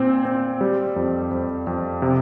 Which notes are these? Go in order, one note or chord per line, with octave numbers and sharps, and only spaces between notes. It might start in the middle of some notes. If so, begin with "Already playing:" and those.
Already playing: A#2 C4
C4
G3
F2
F2
F2
C3